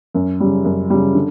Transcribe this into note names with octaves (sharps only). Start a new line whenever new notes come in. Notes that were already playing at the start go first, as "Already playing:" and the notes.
F#2
C#3 G3
F#2
C#3 G3
D3